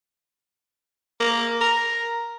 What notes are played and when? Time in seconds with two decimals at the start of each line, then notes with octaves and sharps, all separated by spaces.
1.20 A#3
1.61 A#4